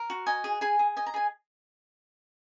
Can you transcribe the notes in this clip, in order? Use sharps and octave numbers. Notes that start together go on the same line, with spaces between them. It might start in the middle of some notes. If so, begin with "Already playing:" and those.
Already playing: A#4
F#4
D#5 G#5
G#4
G#4 G#5
G#4
D#5 G#5
A#5
G#4 G#5